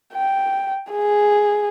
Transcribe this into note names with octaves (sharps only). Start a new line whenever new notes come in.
G5
G#4